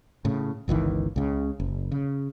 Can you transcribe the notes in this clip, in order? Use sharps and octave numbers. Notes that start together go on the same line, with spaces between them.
A2 C#3
G1 C#2 D#3 E3
C#2 C#3
F#1
C#3